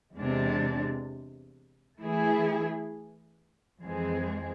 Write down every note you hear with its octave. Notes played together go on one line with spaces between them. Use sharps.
E2 C3 G#3 D4
E3 A3 E4 G#4
F2 E3 G#3 C4 G#4